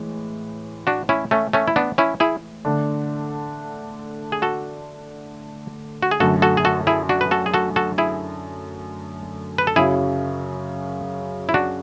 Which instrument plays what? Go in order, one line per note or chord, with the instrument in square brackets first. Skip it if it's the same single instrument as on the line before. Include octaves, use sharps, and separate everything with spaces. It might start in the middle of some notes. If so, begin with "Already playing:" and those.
Already playing: [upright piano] A2 E3 G#3
[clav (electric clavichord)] D4 F#4
C#4 E4
A3 C#4
A3 C#4
E4
B3 D4
C#4 E4
E4 G#4
[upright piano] D3 A3 D4
[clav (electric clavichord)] G#4
F#4 A4
F#4
G#4
[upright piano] F#2 D3 A3 [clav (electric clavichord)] F#4 A4
[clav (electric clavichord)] F#4 A4
G#4
F#4 A4
E4 G#4
D4 F#4
B4
F#4 A4
G#4
F#4 A4
F#4 A4
E4 G#4
B4
A4
[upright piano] F#2 C#3 F#3 [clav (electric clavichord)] E4 G#4
[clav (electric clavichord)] E4
D4 F#4